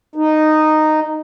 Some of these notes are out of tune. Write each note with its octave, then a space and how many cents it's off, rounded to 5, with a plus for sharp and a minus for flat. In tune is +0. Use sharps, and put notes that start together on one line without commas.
D#4 -10